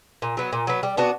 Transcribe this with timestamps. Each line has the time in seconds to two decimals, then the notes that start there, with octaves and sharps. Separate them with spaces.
0.22 A#2
0.37 F#3 B3
0.53 A#2
0.67 F#3 B3
0.83 G3
0.97 B3 D4 F#4